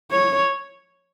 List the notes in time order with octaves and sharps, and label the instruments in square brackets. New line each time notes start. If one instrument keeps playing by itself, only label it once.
[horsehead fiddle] C#5